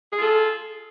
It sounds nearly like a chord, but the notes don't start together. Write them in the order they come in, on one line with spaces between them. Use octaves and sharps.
G#4 F4 A4